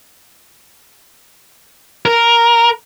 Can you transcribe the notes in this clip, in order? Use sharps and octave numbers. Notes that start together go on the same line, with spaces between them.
A#4